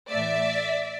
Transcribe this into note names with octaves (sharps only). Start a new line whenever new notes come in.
A2 E3 A3 D5 E5